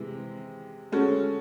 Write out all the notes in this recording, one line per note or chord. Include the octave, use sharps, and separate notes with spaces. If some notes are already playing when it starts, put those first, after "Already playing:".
Already playing: C3 E3 G#3
G#3 C#4 F#4 A4